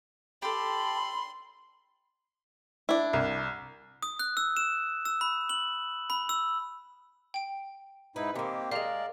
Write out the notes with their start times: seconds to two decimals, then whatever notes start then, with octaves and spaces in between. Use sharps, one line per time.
0.42 G4 A4 B5 C6
2.89 D4 E4
3.13 C2
4.03 D#6
4.19 F#6
4.37 E6
4.57 E7
5.05 E6
5.21 B5
5.49 F#7
6.10 B5
6.29 E6
7.34 G5 D7
8.16 G#2 D#4 E4 B4
8.36 D#3 E3 A#3 C4 G4
8.72 G3 G#3 G#4 A#4 D5 F5